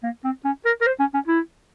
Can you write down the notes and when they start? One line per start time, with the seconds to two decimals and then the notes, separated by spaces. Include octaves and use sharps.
0.04 A#3
0.24 C4
0.45 C#4
0.65 A#4
0.81 A#4
0.87 C5
1.00 C#4
1.14 C#4
1.27 E4